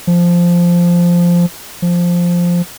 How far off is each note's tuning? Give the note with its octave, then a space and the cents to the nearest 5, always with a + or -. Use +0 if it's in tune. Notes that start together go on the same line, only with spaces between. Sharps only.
F3 -5
F3 +0